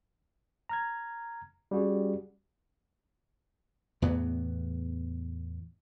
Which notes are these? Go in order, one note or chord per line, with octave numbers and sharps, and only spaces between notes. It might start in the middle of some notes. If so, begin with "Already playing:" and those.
A#5 F6 G#6
G3 C#4 F#4 G#4
E2 A2 E3 B3